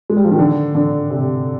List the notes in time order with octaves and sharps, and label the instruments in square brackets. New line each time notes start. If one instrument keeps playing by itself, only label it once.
[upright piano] G#3
G3
F3
D#3
D3
D3
C3